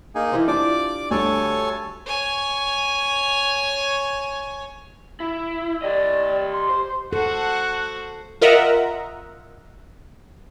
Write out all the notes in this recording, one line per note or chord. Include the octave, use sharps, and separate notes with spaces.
A#3 D#4 G#4
E3 G4 C5
D4 F4 D5 D6
D2 G3 A4 C#5 G#5
C#5 G#5
E4
G4 D5 D#5
C6
C5
F#4 A4 C5 F#5
F4 A#4 D#5 E5 F#5 A#5